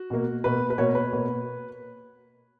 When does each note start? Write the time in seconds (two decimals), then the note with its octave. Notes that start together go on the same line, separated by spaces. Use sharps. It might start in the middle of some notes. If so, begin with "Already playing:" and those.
Already playing: F#4
0.10 B2 A#3
0.44 B2 A#3 B4
0.70 B4
0.78 B2 A#3 C#5
0.95 B4
1.13 B2 A#3